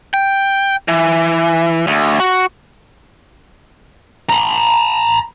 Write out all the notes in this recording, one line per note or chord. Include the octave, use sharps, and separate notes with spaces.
G5
E3
D2
F#4
A#5 B5